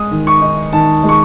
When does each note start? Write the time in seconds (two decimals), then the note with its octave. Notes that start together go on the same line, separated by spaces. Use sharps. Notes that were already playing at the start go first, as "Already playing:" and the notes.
Already playing: G#3 D#6
0.11 D#3
0.27 C#6
0.41 D#4
0.73 D#3 A5
1.03 G#3
1.09 C#6